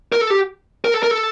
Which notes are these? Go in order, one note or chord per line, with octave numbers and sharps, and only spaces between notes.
A#4
A4
G4
A#4
A4
A#4
A4